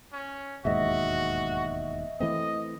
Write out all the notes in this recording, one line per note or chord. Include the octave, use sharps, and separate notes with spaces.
C#4
E1 D#2 G#2 F#4 D#5 E5
E3 A3 C4 D#5